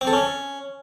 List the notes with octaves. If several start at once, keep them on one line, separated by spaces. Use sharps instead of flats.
C4
A4
C#4